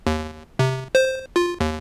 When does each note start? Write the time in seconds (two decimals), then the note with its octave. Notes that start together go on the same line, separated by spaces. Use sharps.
0.07 D#2
0.59 C3
0.95 C5
1.36 F4
1.60 D#2